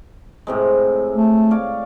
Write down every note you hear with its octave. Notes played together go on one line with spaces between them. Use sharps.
A2 C3 G#3
A3
C#5 D5 F5